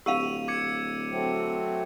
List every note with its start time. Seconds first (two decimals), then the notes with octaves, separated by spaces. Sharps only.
0.06 D1 G4 F5 E6 D#7 F7
0.48 D6 G#6 C#7
1.11 F#3 A3 C4